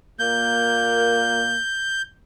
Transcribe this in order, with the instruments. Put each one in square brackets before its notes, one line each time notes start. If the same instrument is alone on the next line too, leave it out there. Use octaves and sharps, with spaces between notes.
[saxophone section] A#2 A#3 [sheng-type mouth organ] G6